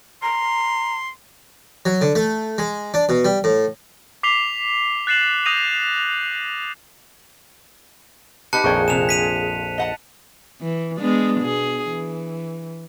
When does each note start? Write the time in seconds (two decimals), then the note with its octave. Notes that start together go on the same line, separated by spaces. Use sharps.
0.23 A#5 C6
1.86 F#3
2.01 D3
2.15 A3
2.58 G#3
2.94 D4
3.09 B2
3.25 G3
3.44 A2
4.23 D6 B6 C7 F7 G7
5.07 F#6 A6 C7 E7 F#7
5.46 D#6 G6 A#6 D#7 F7
8.53 D#4 G4 B4 A5 F#6 C#7
8.64 A#1 F2 D#3 G#4 C#5 F#5 G5
8.88 C3 G#5 E7 F7
9.09 B6 D#7 F7
9.78 D#5 F#5 A5
10.61 E3
10.98 G#3 B3 D4
11.41 B2 G#4
11.89 E3